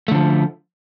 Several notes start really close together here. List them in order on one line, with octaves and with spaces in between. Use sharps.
A3 D3 F3